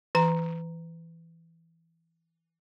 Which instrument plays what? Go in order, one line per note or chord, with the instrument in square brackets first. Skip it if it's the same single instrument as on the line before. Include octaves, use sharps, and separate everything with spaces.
[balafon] E3 A#5